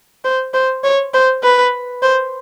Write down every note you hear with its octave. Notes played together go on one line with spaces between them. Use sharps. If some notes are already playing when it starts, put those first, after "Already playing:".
C5
C5
C#5
C5
B4
C5